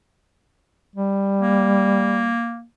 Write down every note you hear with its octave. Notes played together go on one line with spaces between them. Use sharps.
G3
A#3